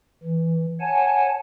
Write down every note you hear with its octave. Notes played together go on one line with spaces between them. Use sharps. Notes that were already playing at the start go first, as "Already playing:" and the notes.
E3
C#5 F#5 G#5 A5